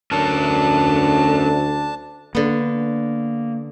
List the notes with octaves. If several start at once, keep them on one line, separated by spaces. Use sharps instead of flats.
D2 C#4 D4 A#4 C#5 A5
D3 A#3 B3